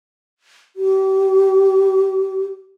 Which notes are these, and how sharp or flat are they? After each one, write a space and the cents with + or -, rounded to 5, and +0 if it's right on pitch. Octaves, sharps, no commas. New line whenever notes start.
G4 -35